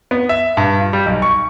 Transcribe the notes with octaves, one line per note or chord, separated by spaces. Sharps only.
B3
E5
G2
F4
G3
B1
C#6